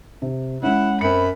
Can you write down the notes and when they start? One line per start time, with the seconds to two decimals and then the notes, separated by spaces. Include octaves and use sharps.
0.22 C3
0.63 G#3 C#4 E4 F#5
1.01 F#2 C4 B5 C#7